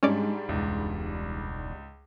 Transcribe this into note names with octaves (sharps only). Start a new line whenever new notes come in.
G#2 G3 G#3 C#4 D4 D5
E1 C#2